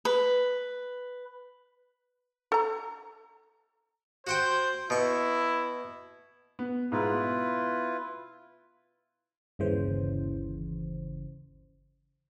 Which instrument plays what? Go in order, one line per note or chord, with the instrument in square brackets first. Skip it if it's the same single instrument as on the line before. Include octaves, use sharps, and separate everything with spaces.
[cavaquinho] B4
[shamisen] A4 A#5
[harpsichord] F#4 F#5 G5 [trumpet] C5
[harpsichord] B2 C#6 [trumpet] E4
[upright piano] B3
[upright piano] G#2 [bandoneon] E4 F4 B4
[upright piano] B2
[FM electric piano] G1 D#2 C#3 E3 C5